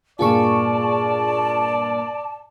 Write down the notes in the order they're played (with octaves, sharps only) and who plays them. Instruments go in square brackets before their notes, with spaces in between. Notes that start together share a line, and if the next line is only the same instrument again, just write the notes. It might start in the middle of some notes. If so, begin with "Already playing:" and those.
[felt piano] G2 A#2 [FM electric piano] F4 G#4 C#6 [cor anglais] D5 [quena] A5